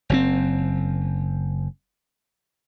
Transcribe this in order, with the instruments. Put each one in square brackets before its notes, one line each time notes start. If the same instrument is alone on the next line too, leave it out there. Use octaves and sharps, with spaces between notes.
[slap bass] F#1 C#3 C4